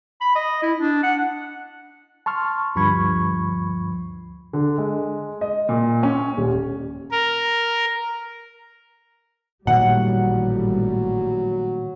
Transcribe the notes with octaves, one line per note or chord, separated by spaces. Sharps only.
B5
D#5
E4
D4
F#5
A5 C6 C#6 F6
D2 G2 F3 B5 C#6 G#6
D3
G#3
D#5
A#2
C#4
D#1
A#4
A1 A#2 D#3 F#3 G3 F#5